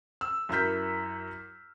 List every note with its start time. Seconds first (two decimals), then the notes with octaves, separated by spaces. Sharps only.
0.21 E6
0.49 F#2 E4 A#4 F6 G6 B6